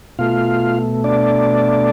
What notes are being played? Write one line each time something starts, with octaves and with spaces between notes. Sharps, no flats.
B2 A3 F4 F5
D4 D5